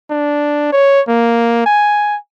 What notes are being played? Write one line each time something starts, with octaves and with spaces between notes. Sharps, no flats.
D4
C#5
A#3
G#5